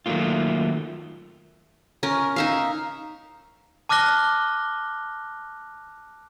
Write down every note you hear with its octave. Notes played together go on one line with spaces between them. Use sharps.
D#3 F#3 A3 A#3 F4
C#4 A#4
D#4 E5 F5
A5 D6 F6 F#6 A#6 G7